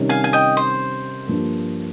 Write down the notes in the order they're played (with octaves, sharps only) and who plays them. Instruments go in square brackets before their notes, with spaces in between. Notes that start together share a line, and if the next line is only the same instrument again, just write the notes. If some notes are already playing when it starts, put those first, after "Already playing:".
Already playing: [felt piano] C3 D#3 G3 C#4
[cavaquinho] F5 G#5
G#5
D#5 G5
C5
[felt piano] G2 F3 A#3